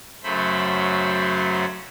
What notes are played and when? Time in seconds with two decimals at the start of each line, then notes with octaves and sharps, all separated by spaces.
0.23 F#2 C#3 F#3 A3 C5 B5